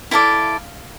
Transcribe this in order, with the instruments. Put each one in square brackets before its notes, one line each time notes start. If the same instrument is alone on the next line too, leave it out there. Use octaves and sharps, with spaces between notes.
[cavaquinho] E4 A4 D5 F5